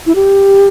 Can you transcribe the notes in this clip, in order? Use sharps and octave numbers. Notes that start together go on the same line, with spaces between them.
E4
G4